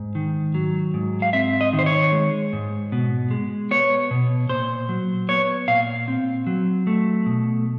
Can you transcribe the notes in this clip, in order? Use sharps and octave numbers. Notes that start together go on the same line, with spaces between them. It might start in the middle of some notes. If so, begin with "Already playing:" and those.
Already playing: G#2
D#3
F#3
G#2
F5
C4 E5
D#5
D#3
C5
C#5
G#3
G#2
B2
G#3
B3 C#5
B2
A#2 C5
F#3
B3 C#5
A#2 F5
C4
F#3
A3
B2